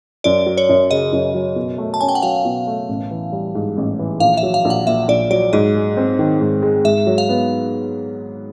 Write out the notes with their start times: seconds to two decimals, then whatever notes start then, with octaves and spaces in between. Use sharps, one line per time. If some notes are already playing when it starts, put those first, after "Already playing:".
0.24 F#2 D5
0.46 F#3
0.58 C#5
0.69 F#2
0.91 C#3 D#5
1.13 F#2
1.35 F#3
1.56 B2
1.78 A3
1.94 A5
2.01 C#4 G#5
2.08 G5
2.15 F#5
2.22 F#3 F5
2.45 B2
2.67 A3
2.89 A1
3.11 E3
3.32 G3
3.55 G#2
3.77 A1
3.99 E3
4.20 A#1 F5
4.37 E5
4.43 F#3
4.54 F5
4.65 A#1
4.70 F#5
4.87 A#2 E5
5.08 A#1 D5
5.31 F#3 D5
5.53 G#2 D#5
5.75 G#3
5.97 C4
6.19 D#3
6.41 G#2
6.63 G#3
6.84 G#2 E5
7.07 F#3
7.18 F5
7.29 B3